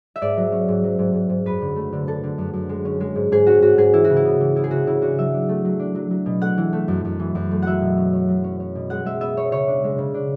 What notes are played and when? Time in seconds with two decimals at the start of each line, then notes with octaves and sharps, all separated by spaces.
0.16 E5
0.22 G#2 D5
0.37 F#3
0.52 C#4
0.68 G#2
0.84 F#3
0.99 G#2
1.14 G#2
1.29 G#2
1.46 F#2 B4
1.62 D3
1.76 A3
1.93 D3
2.07 D3 A4
2.23 D3
2.38 F#2
2.53 F#2
2.69 G#3
2.85 C#4
3.00 G#3
3.15 G#2
3.32 G#2 G#4
3.47 C#4 F#4
3.62 G#2 F#4
3.78 G#2 G#4
3.93 E3 E4
4.04 F#4
4.09 C#3
4.16 E4
4.25 B3
4.40 E3
4.55 B3 E4
4.64 G#4
4.71 C#3 F#4
4.87 C#3 E4
5.01 D4 F#4
5.18 F#3 E5
5.34 D4
5.49 A3
5.65 F#3
5.79 D4
5.95 F#3
6.11 F#3
6.26 B2
6.41 A3 F#5
6.57 E3
6.73 A3
6.88 F#2
7.05 F#2
7.20 E3
7.35 F#2
7.51 A3
7.62 F#3 E5 F#5
7.81 B2
7.97 C#4
8.13 C#4
8.28 F#3
8.44 C#4
8.60 C#4
8.75 B2
8.90 G#3 F#5
9.05 G#3 E5
9.21 B3 E5
9.37 B3 C#5
9.51 C#3 C#5
9.68 D4
9.84 G#3
9.98 C#3
10.14 D4